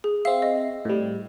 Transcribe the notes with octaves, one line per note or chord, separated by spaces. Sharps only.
G#4
C4 E5 F5
D#5
A2 G3